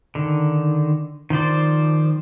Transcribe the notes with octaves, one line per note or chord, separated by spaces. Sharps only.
D3 D#3
D#3 F3 C5 D5